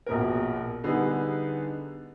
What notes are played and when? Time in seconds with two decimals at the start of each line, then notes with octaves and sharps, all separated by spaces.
0.07 A#1 B2 A#4
0.84 D3 G3 B3 D#4 G#4